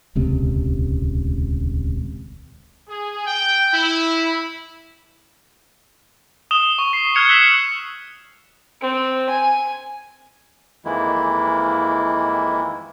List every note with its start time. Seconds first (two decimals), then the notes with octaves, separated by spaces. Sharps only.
0.15 D#1 C#2 C3
2.89 G#4
3.27 G5
3.74 E4
6.51 D#6 E7 G7
6.78 C#6
6.93 C7
7.15 F6 F#6 G#6 C#7 F7 G7
7.29 E6 F#6 B6 C7 E7 F7
8.81 C4
9.29 G#5
10.85 F2 D#3 E3 G#3 A#3 E4